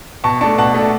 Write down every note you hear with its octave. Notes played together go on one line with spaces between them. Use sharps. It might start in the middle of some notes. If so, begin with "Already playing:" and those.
B2 A5 C#6
A3 D4 A5 C#6
B2 F#5 A5
A3 D4